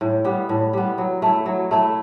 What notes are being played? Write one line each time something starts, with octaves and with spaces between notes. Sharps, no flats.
A2
G3 B3
A2
G3 B3
F#3
A3 E4
F#3
A3 E4